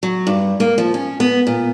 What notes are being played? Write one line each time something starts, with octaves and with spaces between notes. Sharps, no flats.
F#3
G2
A#3
F3
C#4
B3
A#2